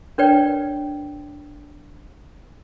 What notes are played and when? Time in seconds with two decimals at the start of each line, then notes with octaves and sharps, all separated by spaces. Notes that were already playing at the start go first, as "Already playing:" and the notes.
0.18 D4 A#4 B4 C#5 D5 G5